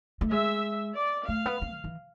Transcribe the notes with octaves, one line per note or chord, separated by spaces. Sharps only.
A3
G#3 E5
D5
A3 F5
B3
C4
D3
E3